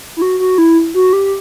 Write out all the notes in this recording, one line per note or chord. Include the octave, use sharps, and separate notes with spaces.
E4
F#4
F#4
E4
F#4
G4